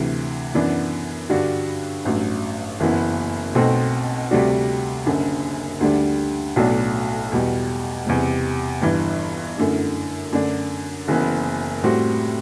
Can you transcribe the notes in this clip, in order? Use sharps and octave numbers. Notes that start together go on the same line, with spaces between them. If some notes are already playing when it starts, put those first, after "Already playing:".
Already playing: D2 C3 E3
F#2 E3 B3 D4
G2 D3 G3 D4 F#4
A1 G2 F#3
F#1 F#2 E3 B3 E4
B1 B2 A3 C4 F#4
D2 C3 G3 D4 F#4
F#1 F#2 D3
D2 D3 G3 D4
B1 A2 F#3 B3 D4
E2 B2 G3
E2 C3 G3
G1 G2 E3
F#2 D3 A3 E4
F#2 D3 A3 D4
F#1 F#2 E3 B3
A2 G3 C4 F#4